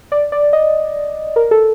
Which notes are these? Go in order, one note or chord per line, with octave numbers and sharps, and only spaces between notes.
D5
D5
D#5
A#4
A4